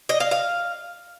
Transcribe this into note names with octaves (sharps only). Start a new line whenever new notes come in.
D#5
F5
F5